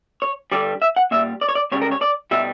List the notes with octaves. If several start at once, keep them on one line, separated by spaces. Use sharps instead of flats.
C#5
G2 D3 G3 D5
E5
F#5
A#2 G3 E5
D5
C#5
D5
C#2 C#3 G3 C#5
A#4
C#5
D5
B2 G3 E5